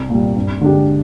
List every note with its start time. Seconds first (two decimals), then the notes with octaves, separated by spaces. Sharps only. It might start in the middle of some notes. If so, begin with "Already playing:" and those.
Already playing: C2
0.10 A#2 G3
0.36 G2
0.61 D3 G#3 D4 G4